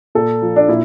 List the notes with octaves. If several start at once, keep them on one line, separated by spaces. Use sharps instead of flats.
A#2 A4
F3
D4
A#2 E4